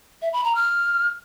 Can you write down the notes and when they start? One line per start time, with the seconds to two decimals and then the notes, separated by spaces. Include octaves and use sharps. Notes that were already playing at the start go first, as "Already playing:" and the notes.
0.22 E5
0.33 B5
0.44 A#5
0.55 F6